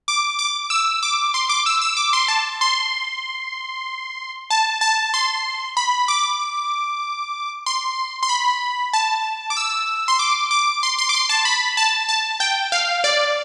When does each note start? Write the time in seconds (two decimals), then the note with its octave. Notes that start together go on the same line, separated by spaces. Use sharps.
0.08 D6
0.39 D6
0.70 E6
1.03 D6
1.34 C6
1.49 D6
1.66 E6
1.81 E6
1.97 D6
2.13 C6
2.28 A5
2.61 C6
4.50 A5
4.81 A5
5.14 C6
5.77 B5
6.08 D6
7.66 C6
8.23 C6
8.29 B5
8.93 A5
9.50 D6
9.57 E6
10.08 C6
10.19 D6
10.51 D6
10.83 C6
10.98 C6
11.09 D6
11.15 C6
11.29 A5
11.45 B5
11.77 A5
12.09 A5
12.40 G5
12.72 F5
13.04 D5